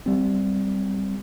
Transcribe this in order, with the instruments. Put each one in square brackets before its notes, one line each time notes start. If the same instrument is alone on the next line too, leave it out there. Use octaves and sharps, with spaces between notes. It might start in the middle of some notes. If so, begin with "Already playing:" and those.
[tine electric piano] G3 C4